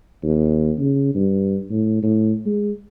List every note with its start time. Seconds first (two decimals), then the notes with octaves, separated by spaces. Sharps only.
0.23 D#2
0.79 C#3
1.15 G2
1.70 A2
2.03 A2
2.46 G#3